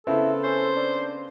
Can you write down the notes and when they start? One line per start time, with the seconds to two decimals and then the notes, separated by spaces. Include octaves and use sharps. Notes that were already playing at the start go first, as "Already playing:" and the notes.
0.07 C#3 B3 C4 E4 A4
0.44 C#4 C5
0.76 D4